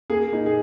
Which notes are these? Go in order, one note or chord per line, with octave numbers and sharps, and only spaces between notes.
A#3 G#4
A#2 D#4
G#4